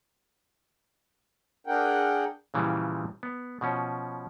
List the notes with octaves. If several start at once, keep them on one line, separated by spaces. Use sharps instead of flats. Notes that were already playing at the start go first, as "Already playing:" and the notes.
D4 G#4 A#4 F#5 G5
A#2 C#3 E3 F3 G3
B3
B2 F3 C#4